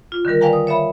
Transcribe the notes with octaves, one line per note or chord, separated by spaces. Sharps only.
F4
D3 D#3 G3 A#4
B4 D5 F5 G5 G#5 A#5
D#6
C#5 E5 F5 B5